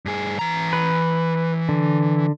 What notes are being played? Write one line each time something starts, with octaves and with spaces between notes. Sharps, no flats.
G2 G#4
E3 A#5
B4
D3